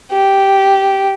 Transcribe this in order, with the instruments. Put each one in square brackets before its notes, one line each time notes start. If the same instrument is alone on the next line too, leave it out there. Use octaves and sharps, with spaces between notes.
[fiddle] G4